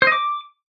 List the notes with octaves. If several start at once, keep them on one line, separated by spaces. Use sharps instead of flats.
C5
D#5
D6